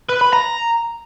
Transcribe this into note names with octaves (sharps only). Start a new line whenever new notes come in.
B4
B5
A#5